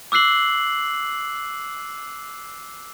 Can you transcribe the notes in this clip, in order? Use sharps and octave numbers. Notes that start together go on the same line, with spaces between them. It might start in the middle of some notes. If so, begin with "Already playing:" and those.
D6 E6 F#6 C7 F#7